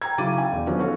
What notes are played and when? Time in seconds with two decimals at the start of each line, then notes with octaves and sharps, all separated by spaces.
0.02 G5 A#5 G#6
0.18 C#3 F#3 E4 D6 A6 D#7
0.38 G5 G#5
0.52 E1 E2
0.67 D3 F3 F#3 B3 C#4 D#4
0.80 F#4 A4 C#5 F5